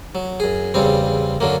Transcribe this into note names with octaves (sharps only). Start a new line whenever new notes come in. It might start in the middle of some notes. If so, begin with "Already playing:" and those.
F#3
F#2 G#4
E2 C#3 G3 C4
F#2 D3 F#3 A#3